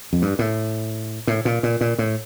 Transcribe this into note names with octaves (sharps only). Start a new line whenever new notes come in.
F2
G2
A2
A2
A#2
A#2
A#2
A2